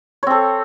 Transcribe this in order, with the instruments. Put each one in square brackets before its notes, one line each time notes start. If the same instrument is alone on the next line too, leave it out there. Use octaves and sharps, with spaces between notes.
[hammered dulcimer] C#5
C4
A4